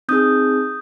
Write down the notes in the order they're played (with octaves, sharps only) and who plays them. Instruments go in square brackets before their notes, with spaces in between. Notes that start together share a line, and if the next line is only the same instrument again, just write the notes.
[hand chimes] C4 D#4 G#4 D#6 G6